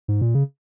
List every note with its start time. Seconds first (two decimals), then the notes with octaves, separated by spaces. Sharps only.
0.08 G#2
0.21 A#2
0.34 C#3